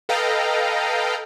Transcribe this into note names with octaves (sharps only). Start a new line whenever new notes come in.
A4 B4 D#5 F5 G5 A#5